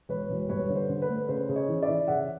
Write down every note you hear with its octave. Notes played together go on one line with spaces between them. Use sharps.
E1 B4 C#5
E1
G2 B4 C#5
D3
C5
D3
B4
A3
C#3 C5
C#3
C#5 D#5
E3
D5 E5
E3
C#3 E5 F#5